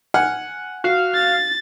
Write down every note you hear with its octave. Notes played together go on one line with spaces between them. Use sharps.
F#5 G#5 F6
F#4 F5
A6